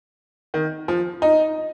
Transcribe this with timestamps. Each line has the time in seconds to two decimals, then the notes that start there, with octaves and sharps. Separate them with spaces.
0.54 D#3
0.88 F3
1.22 D#4